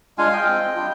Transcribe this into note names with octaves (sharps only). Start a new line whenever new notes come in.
G#3 D4 F4 F5 G#5
D#5 G5
G#3 C4 F4
G3 D4 F4